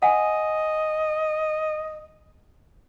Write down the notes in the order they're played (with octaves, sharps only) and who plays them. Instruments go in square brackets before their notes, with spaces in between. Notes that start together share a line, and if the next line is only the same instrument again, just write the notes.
[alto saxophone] D#5 [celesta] F#5 G#5